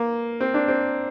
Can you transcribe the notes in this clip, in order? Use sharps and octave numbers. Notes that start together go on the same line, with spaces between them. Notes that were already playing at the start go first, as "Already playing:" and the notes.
Already playing: A#3
C4
D4
C4